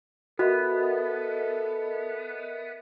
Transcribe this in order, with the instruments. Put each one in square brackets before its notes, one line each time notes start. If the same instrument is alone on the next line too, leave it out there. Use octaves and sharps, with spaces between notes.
[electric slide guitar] B3 [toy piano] F#4 [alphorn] A4 [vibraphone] A#4 D#5 E5